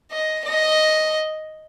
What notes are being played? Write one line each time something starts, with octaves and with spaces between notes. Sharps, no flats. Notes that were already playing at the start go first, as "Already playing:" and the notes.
D#5
D#5